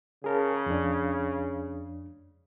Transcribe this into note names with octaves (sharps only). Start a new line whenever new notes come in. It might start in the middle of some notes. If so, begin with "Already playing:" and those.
C#3 G#4 A#4 A5
F2 D4